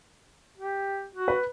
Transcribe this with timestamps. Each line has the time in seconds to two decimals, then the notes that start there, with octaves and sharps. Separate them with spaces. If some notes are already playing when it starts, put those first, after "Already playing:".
0.58 G4
1.15 F#4
1.28 B4